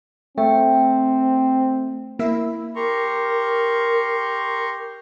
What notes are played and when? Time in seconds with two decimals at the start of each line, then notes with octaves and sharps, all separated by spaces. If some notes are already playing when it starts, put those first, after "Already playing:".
0.38 A3 C4 G5
2.19 A#3 E4 E5
2.76 G4 A#4 A#5 C6 C#6